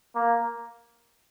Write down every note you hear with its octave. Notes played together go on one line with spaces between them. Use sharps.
A#3